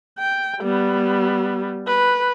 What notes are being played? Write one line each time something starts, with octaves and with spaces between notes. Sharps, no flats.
G5
G3 B3
B4